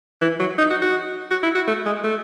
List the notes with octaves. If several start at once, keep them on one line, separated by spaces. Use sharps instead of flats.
E3
F#3
D#4
F#4
F#4
F#4
E4
F#4
A3
G#3
A3